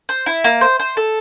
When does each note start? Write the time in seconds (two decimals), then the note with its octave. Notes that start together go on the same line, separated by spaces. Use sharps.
0.09 C5
0.26 E4
0.44 A#3
0.61 C5
0.80 C5
0.97 A4